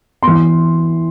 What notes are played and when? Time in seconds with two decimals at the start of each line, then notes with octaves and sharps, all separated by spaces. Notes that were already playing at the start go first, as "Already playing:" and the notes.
0.23 E3 B3 C6